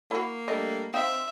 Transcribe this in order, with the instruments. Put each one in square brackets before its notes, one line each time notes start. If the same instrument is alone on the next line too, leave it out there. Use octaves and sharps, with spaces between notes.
[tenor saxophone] A#3 [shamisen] E4 F#4
[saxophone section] G3 A3 D4 [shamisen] D#5
[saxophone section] C4 [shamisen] D#4 F5 G5 [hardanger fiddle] E5